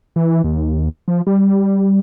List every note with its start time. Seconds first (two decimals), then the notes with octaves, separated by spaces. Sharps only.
0.16 E3
0.44 D#2
1.08 F3
1.27 G3